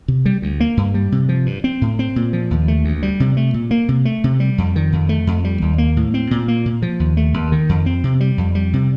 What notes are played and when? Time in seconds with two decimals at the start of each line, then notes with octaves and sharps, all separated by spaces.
0.08 C3
0.26 G3
0.42 D2
0.60 A#3
0.77 G2
0.94 G3
1.12 C3
1.29 F3
1.46 G2
1.64 C4
1.81 A2
1.99 C4
2.16 A#2
2.33 F3
2.51 D#2
2.68 A3
2.85 D2
3.03 G3
3.20 C3
3.37 A3
3.54 A#2
3.71 A#3
3.88 C3
4.05 A3
4.24 C3
4.40 G3
4.58 F2
4.76 D#3
4.93 F2
5.09 A3
5.27 F2
5.44 G3
5.62 D#2
5.78 A#3
5.97 A2
6.14 C4
6.31 A#2
6.48 A#3
6.66 A#2
6.82 F3
7.00 D#2
7.17 A3
7.34 D#2
7.52 D#3
7.69 F2
7.86 C4
8.04 C3
8.20 G3
8.38 F2
8.55 G3
8.73 C3